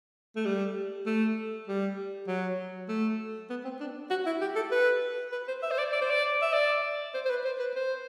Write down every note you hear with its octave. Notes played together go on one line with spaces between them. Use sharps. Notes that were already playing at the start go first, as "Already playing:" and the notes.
A3
G3
A3
G3
F#3
A3
B3
C4
D4
F#4
E4
G4
A4
B4
B4
C5
E5
C5
D5
D5
C5
D5
E5
D5
C5
C5
B4
C5
B4
C5